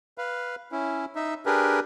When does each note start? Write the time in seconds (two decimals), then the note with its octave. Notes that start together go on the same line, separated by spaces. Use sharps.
0.18 B4 F5
0.72 C#4 E4
1.16 D#4 E5
1.46 D4 G4 G#4 A#4 B4